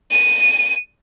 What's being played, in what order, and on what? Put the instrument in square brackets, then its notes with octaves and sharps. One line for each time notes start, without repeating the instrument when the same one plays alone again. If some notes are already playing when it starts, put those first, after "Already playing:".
[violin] D#7